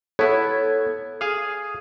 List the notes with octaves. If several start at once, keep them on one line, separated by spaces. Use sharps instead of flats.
B3 E4 A4 C#5 G#6
G#4 F5 D#6